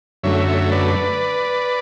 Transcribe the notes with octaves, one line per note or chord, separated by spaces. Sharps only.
F#2 D3 F#3 A3 C#5 E5
C#5 E5
B4 D5